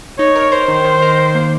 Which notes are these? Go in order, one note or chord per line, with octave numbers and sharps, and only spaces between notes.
D#4 C#5
A#4
A#4 C5
D#3
D#3
A#4
D#3
A#3